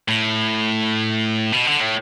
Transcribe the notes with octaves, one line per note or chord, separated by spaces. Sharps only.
A2
B2
D3
A2